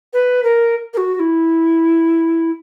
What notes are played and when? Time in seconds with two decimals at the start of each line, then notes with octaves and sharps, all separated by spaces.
0.13 B4
0.43 A#4
0.94 A#4
0.97 F#4
1.15 F#4
1.20 E4